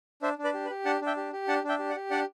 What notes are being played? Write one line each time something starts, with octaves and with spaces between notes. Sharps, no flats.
D4 C5 E5
D4
B4 D5
G4
B4
G4
D4 F#5 A5
D4
E5 G5
G4
G4
D4 F#5 A5
D4
E5 G5
G4
D5 F#5
G4
D4 D5 F#5